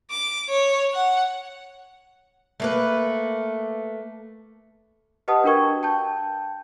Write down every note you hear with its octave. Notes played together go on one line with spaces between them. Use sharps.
D6
C#5
F#5
A3 A#3 B4
G4 B4 D#5 F#5 A5 D#6
D4 F#4 A#4 G5 C#6 G#6
G5 A5 G6